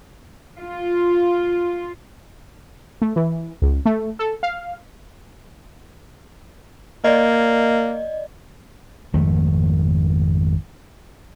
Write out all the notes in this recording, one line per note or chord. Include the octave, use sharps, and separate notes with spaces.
F4
A3
E3
C#2
A3
A4
F5
A#3 D5 D#5
G#1 F2 D#3 A3